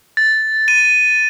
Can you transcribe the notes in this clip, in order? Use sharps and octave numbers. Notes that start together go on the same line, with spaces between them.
A6
D#7